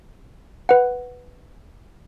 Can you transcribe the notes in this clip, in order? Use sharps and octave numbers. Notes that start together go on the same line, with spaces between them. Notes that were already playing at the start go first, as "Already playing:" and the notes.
B4 F#5